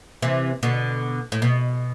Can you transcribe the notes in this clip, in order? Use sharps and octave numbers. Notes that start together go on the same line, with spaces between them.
C3 E3
B2 D3
A2
B2